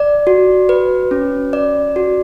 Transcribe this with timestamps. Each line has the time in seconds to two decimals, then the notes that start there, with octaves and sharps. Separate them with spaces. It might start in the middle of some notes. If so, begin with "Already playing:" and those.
Already playing: D5
0.27 F#4
0.69 B4
1.11 C#4
1.53 D5
1.96 F#4